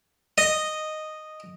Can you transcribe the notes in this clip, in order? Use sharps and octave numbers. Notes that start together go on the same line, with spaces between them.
D#5